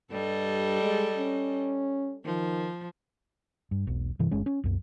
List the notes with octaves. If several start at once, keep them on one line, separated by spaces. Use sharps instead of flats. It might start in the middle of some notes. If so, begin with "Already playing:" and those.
G2 G3 A4 D#5
G#3
C#4
D#3 F3
G2
E1 B1
G2 C3 E3
G1 G#3 C#4
C#4
C2 F#2